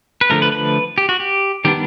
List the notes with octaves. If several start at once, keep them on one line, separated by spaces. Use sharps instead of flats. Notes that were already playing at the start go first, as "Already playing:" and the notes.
B4
D3 F3 A3 A#4
B4
B4
G4
F#4
G4
D#3 G3 B3 D4 G4